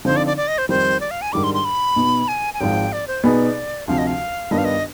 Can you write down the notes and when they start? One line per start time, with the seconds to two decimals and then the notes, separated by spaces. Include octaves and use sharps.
0.05 D3 F3 C4 D#4 C5
0.16 D5
0.27 D5
0.37 D5
0.48 D#5
0.58 C5
0.69 F2 D#3 G3 C5
1.00 D5
1.11 F5
1.22 G#5
1.33 G#2 D#3 G3 D4 D6
1.44 C6
1.54 C6
1.65 B5
1.96 B2 B3 D#4
2.28 G#5
2.54 G#5
2.60 G#1 G#2 F3 G5
2.93 D5
3.07 C5
3.23 B2 B3 D#4 G#4 D5
3.87 D2 C3 F3 F5
3.98 D#5
4.07 F5
4.51 G2 D#3 B3 D4 F4 D#5
4.58 F5
4.65 D#5